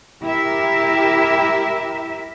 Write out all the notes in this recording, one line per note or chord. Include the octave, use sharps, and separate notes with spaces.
E4 G4 A#4 E5